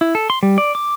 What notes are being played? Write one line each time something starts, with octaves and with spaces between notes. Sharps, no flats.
E4
A4
C6
G3
D5
D6